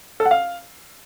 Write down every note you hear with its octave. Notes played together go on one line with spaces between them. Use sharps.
A4
F#5
F5